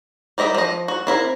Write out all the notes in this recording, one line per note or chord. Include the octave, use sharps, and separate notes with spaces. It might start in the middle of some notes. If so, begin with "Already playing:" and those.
G3 A#4 D#5 E5
F3 D#5
F#4
C4 E4 A#4